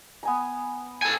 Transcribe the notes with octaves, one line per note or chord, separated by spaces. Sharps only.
B3 G#5 A#5
A4 G#5